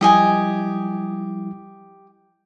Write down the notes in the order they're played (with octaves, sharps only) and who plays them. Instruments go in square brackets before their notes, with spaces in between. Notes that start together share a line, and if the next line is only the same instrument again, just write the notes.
[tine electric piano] F3 G3 E4 [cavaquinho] G4 D#5 G#5